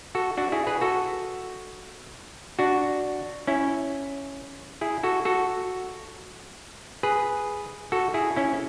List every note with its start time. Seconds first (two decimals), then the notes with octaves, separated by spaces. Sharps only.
0.15 F#4 A4
0.37 D4 F#4
0.52 E4 G#4
0.67 G#4 B4
0.81 F#4 A4
2.59 D4 F#4
3.47 C#4 E4
4.81 E4 G#4
5.03 F#4 A4
5.25 F#4 A4
7.03 G#4 B4
7.92 F#4 A4
8.14 E4 G#4
8.36 C#4 E4